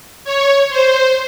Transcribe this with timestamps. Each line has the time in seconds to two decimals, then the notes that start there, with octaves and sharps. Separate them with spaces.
0.24 C#5
0.69 C5